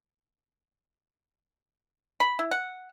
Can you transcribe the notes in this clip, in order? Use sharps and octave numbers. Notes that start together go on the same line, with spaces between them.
B5
E4
F#5